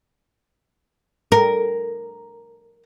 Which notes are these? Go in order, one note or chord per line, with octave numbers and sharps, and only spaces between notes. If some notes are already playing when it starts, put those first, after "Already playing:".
A#4